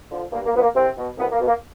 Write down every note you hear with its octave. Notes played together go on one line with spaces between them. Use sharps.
D3 F3
G2 A#3
A#3
D3 F3 B3
A#3
C2 C3 C4
B2
C2 B2 B3
A#3
B2
A#3